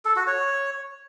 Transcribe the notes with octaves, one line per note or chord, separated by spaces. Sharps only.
A4
F#4
C#5